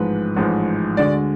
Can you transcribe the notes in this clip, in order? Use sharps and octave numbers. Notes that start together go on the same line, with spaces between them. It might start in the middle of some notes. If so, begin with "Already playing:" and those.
Already playing: A1 G#2 F3 G#3 B4
A1 G#2 F3 G#3
D2 D3 G#3 D5